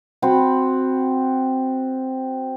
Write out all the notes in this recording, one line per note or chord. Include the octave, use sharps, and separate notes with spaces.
C4 F#4 C5 B5